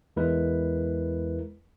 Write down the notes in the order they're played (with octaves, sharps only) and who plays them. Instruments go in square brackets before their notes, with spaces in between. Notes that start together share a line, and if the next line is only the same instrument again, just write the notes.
[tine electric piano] E2 G#3 E4 A#4 B4